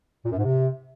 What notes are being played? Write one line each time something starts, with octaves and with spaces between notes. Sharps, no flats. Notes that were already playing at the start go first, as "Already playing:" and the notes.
A#2
F#2
G#2
C3